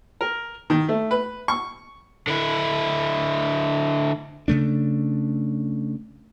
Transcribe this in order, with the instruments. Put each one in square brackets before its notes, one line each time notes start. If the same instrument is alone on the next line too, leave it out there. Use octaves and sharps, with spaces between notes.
[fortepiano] A#4
D#3
A3
B4
C#6
[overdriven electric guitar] D3 E4
[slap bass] C#3 A3 D4